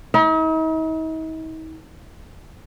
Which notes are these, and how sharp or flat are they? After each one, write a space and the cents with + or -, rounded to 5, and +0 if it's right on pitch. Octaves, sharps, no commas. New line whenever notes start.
D#4 +45